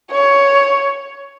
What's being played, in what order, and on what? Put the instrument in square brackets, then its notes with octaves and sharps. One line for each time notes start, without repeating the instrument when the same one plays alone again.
[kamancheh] C#5